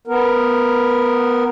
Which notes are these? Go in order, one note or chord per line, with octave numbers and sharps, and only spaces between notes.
B3 A#4